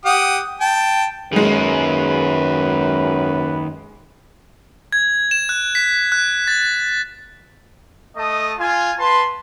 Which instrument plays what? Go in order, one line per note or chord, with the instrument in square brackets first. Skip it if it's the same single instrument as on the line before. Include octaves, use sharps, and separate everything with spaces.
[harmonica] G4 F#5 D#6
G5 A5
[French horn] F#2 [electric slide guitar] D#3 A#3 [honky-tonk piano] G#3 G#4 [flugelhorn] B4
[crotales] G#6
E7
F#6
B6
F#6
A6
[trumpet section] A3 D#5 A5 D#6
F4 G#5
B4 A5 C6